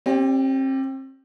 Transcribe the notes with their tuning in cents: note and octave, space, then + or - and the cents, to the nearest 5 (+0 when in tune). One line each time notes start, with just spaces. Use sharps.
C4 +40 G4 +0 D5 +0